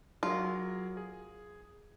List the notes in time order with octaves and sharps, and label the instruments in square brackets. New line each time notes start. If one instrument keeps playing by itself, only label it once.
[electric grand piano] F#3 G#4 A#4 [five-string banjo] F4
[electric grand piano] G#4